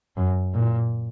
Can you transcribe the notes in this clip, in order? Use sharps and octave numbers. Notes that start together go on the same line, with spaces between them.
F#2
A#2